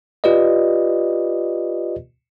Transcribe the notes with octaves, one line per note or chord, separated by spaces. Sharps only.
F4 G4 B4 D5 D#5